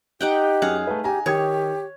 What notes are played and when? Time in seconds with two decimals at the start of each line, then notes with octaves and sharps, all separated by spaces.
0.21 D#4 G4 F#5 G5
0.62 F#2 G#4 F5 F#5
0.87 A3 B4
1.04 G4 G#5 A#5
1.26 D#3 G4 C#5 D#6 G#6